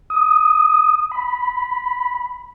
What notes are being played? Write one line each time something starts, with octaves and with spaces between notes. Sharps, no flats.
D#6
B5